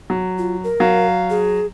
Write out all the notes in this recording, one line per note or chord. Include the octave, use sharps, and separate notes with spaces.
F#3
F4
A#4
F#3 F5
G#4